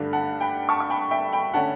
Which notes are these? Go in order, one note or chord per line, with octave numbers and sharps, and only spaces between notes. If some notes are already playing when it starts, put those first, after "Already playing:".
Already playing: G2 D3 A3 D4
F#5 A5
G5 B5
A5 C#6
C#6
G5 B5
E5 G5
G5 B5
D3 A3 C#4 F#5 A5